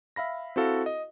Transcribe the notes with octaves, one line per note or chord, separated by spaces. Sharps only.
E5 F5 B5 A#6
C4 E4 F#4 A4 F5
D#5